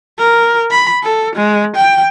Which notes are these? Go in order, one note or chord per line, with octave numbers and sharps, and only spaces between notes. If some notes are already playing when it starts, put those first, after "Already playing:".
A#4
B5
A4
G#3
G5